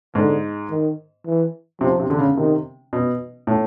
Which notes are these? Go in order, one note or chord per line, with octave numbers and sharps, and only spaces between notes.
G#2 D3
D#3
E3
C3 F3
C3
D3
C#3
C3 D#3
B2
A2